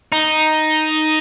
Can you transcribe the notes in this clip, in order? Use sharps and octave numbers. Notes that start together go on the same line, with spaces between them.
D#4